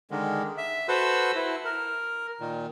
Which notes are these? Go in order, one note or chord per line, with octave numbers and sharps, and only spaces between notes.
D3 D#3 G#3
E5
F#4 A4 B4 C5 E6
E4
A#4
A#2 D#3